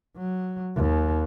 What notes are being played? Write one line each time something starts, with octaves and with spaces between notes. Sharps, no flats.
F#3
D#2